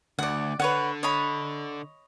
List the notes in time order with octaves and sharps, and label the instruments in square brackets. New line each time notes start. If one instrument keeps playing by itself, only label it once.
[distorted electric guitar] D2 [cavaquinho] D5 F#5
[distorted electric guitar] D3 [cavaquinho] B4 C#5 F#5
[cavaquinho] C#5 D#5 B5